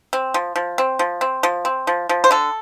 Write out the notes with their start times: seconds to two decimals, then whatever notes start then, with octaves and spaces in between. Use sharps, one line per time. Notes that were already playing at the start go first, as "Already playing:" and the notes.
0.13 C4
0.34 F3
0.56 F3
0.78 C4
0.99 F3
1.21 C4
1.43 F3
1.65 C4
1.87 F3
2.09 F3
2.24 C5
2.31 D3 A4